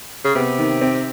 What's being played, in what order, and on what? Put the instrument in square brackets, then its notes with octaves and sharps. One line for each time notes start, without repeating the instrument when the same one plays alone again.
[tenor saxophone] C#3
[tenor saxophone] C3 [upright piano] B3
[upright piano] D#3
C4